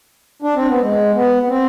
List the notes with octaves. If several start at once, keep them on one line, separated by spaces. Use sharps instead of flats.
D4
C4
B3
G#3
B3
B3
C4